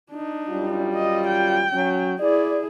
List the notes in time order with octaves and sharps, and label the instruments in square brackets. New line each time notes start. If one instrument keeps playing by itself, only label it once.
[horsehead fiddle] D4 D#4
[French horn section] F#2 G3 F4
[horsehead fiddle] D#5
G5
[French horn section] F#3 C#4
[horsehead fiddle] E4 G#4 [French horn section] D5